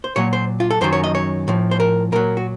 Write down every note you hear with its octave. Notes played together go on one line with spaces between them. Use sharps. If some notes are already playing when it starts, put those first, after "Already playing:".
C5
A#2 F#3 C#5
C5
F4
A4
F#2 D#3 F#3 C5
C#5
D#5
C#5
A2 F3
C5
A#4
A#2 F#3 A#4
F#4